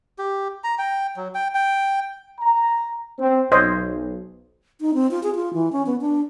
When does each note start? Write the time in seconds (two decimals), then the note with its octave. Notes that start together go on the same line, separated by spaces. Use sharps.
0.18 G4
0.64 A#5
0.79 G5
1.17 F#3
1.35 G5
1.55 G5
2.40 A#5
3.19 C4
3.52 B1 C5 C#5 D#5
4.81 D#4
4.94 C4
5.11 F4
5.23 G#4
5.35 F4
5.54 E3
5.72 C#4
5.86 B3
6.01 D4